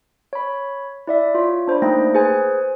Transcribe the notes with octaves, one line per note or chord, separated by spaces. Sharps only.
C#5 B5
E4 D5 E5
F4 C#5
D4 C5 D5 B5
A3 A#3 D#4 G5 A#6
G#4 B4 C5 G#5